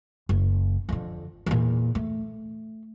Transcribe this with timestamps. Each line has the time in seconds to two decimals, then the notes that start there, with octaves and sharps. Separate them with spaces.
0.29 F#1
0.89 F2 D3
1.46 E2 A#2
1.95 A3